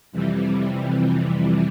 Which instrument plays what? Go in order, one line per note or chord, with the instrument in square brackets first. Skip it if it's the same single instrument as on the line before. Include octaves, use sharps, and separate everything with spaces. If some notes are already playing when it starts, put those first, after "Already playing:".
[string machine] F2 C3 E3 G3